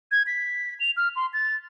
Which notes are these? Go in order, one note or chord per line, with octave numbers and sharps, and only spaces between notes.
G#6
B6
F7
F6
C6
A6